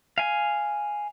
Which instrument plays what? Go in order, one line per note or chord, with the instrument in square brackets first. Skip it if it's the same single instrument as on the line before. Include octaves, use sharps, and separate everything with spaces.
[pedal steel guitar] F5 G#5